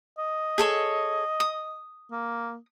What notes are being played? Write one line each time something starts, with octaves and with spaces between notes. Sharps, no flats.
D#5
G#4 A4 C#5
D#6
A#3